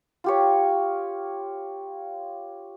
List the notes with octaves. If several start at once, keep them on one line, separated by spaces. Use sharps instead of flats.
F4 G4 C#5